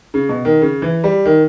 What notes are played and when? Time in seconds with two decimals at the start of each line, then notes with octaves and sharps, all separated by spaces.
0.14 C#3
0.29 B2
0.45 D#3
0.62 C#3
0.82 E3
1.04 G3
1.25 D#3